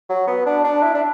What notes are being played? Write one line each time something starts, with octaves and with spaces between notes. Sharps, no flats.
F#3
B3
D4
D4
E4
D4